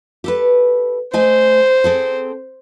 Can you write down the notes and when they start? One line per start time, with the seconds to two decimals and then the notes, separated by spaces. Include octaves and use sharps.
0.24 G4 A4 B4
1.13 A3 C5 D#5 G#5
1.84 C4 G#4 A4